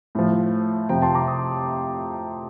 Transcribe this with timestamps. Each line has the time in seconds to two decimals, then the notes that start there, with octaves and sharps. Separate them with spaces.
0.15 A2 F3
0.89 F2 C3 F3 G5 A#5
1.02 A5 C6
1.14 A#5 D6
1.28 D#6